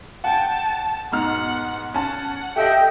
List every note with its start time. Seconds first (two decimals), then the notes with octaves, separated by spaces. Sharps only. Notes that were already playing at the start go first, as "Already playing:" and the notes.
0.24 F#5 G5 A5
1.12 G#2 B2 F#5 F6
1.94 C#4 F#5 A5
2.56 G4 A4 D#5 E5 G5